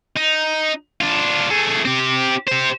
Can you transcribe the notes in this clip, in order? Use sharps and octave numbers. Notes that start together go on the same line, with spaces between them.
D#4
D4 F4
A3 G#4
C4 G4
G4 C5